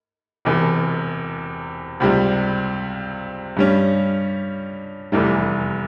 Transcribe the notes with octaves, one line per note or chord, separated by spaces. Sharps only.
E1 E2 C3
C#2 C3 G3
G2 G3 C#4
F1 E2 E3 G3